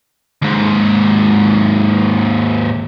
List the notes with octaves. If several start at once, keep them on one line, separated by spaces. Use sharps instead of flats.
D#2 G#2